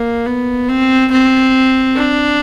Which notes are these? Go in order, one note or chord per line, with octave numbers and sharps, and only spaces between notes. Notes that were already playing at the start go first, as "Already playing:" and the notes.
Already playing: A#3
B3
C4
C4
D4